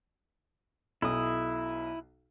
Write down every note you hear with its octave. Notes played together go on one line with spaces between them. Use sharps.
B1 E4 D#6